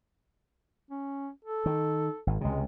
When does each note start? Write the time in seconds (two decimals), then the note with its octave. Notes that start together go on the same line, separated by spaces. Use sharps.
0.90 C#4
1.45 A4
1.66 D#3
2.27 G#1
2.41 C#2 C3 G#3